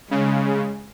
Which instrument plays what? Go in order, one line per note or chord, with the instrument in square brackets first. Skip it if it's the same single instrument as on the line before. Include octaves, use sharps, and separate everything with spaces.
[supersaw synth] C#3 [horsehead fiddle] G#3